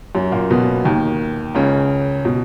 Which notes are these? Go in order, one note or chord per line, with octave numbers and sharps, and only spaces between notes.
F#2 F#3
A#2 A#3
B2 B3
D#2 D#3
C#2 C#3
B2